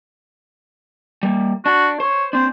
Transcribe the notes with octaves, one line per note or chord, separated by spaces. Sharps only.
G3 A#3
D4 F#4
C5 C#5
C4 D4 C5